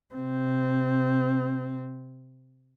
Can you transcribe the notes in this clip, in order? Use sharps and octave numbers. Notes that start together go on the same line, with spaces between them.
C3 C4